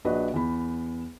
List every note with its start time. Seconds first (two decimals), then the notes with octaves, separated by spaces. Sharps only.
0.05 A#1 D4 F#4 B4 D#5
0.34 E2 B5